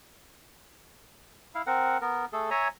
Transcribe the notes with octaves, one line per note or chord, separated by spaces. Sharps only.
E4 F5
C4 A#4 F#5
B3 A#4
A3 G#4 A4
C#5 E5 G#5 A#5